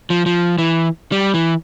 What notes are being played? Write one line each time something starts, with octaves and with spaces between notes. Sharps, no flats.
F3
F3
E3
G3
E3